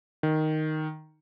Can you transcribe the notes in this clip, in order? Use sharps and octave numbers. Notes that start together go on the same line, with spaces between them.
D#3